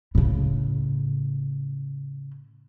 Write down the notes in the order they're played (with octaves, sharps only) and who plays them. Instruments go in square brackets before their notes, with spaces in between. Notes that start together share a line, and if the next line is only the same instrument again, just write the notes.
[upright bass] A2 C#3